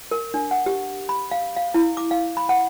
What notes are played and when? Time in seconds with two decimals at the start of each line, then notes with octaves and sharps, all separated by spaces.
0.11 A#4
0.34 D4
0.51 F#5
0.66 G4
1.09 B5
1.31 F5
1.57 F5
1.74 E4
1.97 D6
2.11 F5
2.37 B5
2.49 F#5